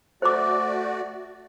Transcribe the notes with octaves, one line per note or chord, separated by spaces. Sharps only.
A3 F#4 C5 D5 D6